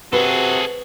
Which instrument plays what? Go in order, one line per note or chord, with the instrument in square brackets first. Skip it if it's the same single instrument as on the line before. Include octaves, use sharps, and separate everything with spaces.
[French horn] C3 [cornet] F#4 [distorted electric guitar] G#4 A4 [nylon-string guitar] B4